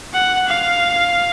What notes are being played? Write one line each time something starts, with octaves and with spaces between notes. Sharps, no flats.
F#5
F5